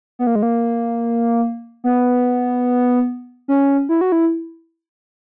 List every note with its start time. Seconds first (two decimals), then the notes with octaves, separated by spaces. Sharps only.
0.19 B3
0.27 A#3
0.35 G#3
0.43 A#3
1.84 B3
3.48 C#4
3.89 E4
4.01 F#4
4.12 E4